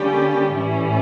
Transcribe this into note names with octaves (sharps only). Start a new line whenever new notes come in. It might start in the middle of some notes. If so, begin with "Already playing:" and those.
Already playing: D3 G3 A#3 C#4 G4
A2 E3 G3 C#4 E4